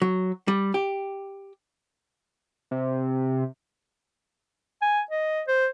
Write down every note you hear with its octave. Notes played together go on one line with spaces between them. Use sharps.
F#3
G3
G4
C3
G#5
D#5
C5